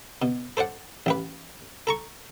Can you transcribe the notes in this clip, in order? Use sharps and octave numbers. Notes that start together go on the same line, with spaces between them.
B2
A4 C5 D5 F#5
A1 G4 B4
A4 A#5 C#6